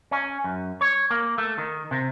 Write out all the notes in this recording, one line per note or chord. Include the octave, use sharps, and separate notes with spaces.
C#4
F#2
C#5
A#3
A3
D#3
C3